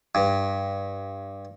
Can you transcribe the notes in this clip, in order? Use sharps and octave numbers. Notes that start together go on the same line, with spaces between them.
G2